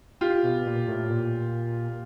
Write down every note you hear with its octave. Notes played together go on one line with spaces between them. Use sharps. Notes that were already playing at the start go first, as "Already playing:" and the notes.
F4 G4
B2
A#2
A2
A#2